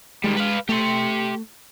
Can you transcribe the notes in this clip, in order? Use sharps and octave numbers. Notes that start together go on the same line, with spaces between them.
D#3 G3 G#3
B4 F5
A3 G4 C6